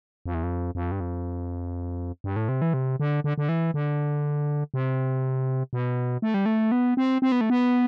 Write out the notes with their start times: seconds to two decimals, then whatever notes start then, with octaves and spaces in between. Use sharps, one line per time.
0.26 F2
0.34 E2
0.43 F2
0.75 F2
0.92 G2
1.00 F2
2.24 G2
2.36 A2
2.49 C3
2.62 E3
2.74 C3
3.00 D3
3.24 D3
3.38 D3
3.49 E3
3.74 D3
4.74 C3
5.73 B2
6.22 A3
6.34 G3
6.46 A3
6.72 B3
6.97 C4
7.22 C4
7.32 B3
7.41 A3
7.50 B3